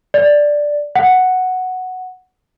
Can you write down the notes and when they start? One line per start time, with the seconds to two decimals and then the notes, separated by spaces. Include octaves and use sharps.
0.14 D5
0.96 F#5